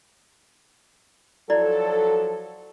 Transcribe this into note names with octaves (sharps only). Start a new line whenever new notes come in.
F3 F#3 E4 A4 D5